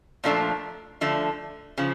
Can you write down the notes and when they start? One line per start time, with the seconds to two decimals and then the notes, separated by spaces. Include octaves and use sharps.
0.24 A#2 F3 A3 D4 F4
1.01 D3 F3 A3
1.77 C#3 F3